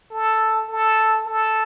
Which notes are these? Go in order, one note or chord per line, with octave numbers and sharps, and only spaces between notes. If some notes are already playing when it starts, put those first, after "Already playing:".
A4
A4
A4